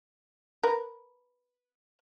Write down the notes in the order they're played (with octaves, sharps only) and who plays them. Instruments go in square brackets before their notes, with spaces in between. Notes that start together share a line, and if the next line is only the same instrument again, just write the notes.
[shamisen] A#4 B4